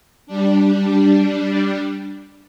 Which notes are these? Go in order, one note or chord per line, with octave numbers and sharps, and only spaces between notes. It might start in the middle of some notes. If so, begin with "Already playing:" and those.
G3 D4